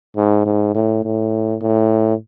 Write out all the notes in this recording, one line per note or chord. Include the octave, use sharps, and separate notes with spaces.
G#2
G#2
A2
A2
A2